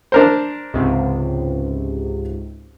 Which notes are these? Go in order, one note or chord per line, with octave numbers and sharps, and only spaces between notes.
D4 A#4 C5
C#2 G#2 C3